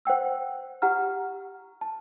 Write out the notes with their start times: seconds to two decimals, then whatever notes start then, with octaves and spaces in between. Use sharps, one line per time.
0.05 C5 F#5 G5 E6
0.82 G4 F#5 A#5 F6
1.81 A5